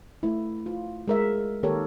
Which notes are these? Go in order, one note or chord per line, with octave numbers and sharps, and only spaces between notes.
A3 E4
F4
G#3 A#4 E5
D#3 A#3 G4 A4 A#4 C#5